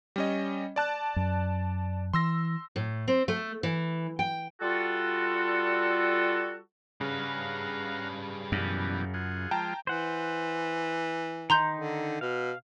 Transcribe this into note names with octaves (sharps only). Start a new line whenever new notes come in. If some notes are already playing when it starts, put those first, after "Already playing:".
G3 C#4 D#5
D5 A5 F#6
F#2
E3 C6 E6 A#6
A2
C4
A3
E3
G5
G3 F4 F#4 A4
C#3 G3 B4 F5 F#5 A#5
F#2 B2 E3 G4
F4 G#4 F#5
F3 G#3 F4 G5 A5 A#5
E3 C5 F#5
D#3 D#4 A#5 C6 G6
D3
B2 F5